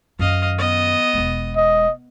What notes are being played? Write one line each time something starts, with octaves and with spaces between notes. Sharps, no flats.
F#2 D#3 D#5 F5
B3 D#5
E1 G#3
D#5